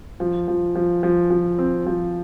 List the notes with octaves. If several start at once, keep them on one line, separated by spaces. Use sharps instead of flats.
F3
F3
F3
F3
F3
C4
F3